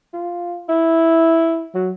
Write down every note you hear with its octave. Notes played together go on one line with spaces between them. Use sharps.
F4
E4
F#3